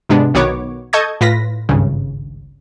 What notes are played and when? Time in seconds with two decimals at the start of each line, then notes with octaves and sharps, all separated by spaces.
0.09 G#2 C3 G#3 B3 D4
0.34 B1 D#3 B3 F#4 C#5 D6
0.93 A4 D#5 A5 C#6 G6 G#6
1.21 A2 F4 B4 A#6 B6
1.69 G#1 C#2 G2 C#3